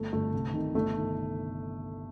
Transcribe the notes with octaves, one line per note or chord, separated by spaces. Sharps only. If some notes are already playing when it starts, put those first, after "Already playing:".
Already playing: G1 A3
G2 D3 A3
C2
C3 D#3
G1 A3
D#3